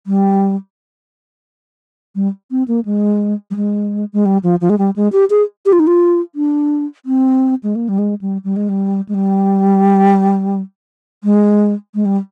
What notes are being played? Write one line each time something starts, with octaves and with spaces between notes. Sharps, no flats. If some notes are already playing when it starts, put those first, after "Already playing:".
G3
G3
C4
A#3
G#3
G3
G#3
G#3
G3
F3
F3
G#3
G3
G#3
G4
G#4
G4
F4
D#4
F4
D4
C4
G#3
A#3
G3
G#3
G3
G3
G#3
G3
G#3
G3
G#3
G#3
G3